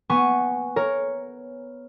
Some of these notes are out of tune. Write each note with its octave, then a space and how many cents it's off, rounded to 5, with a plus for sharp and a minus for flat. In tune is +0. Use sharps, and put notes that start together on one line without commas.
B3 +0 G#5 +0 C#6 +0
A#4 +0 C#5 +0